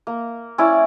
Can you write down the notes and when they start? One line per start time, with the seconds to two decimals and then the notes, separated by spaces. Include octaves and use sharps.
0.07 A#3
0.58 C#4 E4 D5